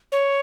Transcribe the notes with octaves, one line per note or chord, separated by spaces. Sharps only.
C#5